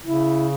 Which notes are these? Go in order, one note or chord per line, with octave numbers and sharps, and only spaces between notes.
C#3 E4